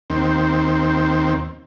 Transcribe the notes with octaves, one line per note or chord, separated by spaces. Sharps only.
D#2 C4